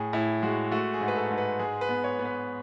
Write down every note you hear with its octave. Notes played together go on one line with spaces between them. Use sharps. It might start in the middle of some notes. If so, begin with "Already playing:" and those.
Already playing: A2 G#4
A2 E4
G#3 F#4
A3 F#4
G#4
G#2
B4
A4
G#2
B4
G#3 G#4
B4
B3
C#5
B3
B4